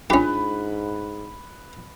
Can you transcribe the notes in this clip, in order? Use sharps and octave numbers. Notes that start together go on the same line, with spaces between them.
G#2 C#4 D4 F4 G4 B4